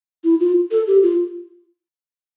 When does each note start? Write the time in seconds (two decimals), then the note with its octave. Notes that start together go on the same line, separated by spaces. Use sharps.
0.24 E4
0.40 F4
0.71 A4
0.87 G4
1.03 F4